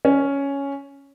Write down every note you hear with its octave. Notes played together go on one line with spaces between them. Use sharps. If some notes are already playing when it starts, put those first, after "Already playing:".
C#4